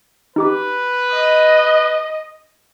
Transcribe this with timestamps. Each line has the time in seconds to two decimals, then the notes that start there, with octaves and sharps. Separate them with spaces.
0.36 D#4 G4 B4 D6
1.13 D#5